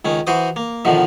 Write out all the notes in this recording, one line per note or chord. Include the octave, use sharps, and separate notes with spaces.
C#2 D#3 C#4
E3 F#4 C5 D#6
A#3
E2 B2 D3 D#3 F3